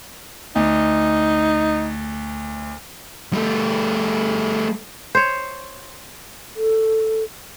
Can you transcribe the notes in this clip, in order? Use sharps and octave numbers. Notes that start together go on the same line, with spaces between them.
D2 D#4
G3 A3
C5 C#5
A4